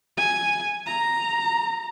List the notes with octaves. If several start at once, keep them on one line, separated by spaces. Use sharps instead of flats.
G#5
A#5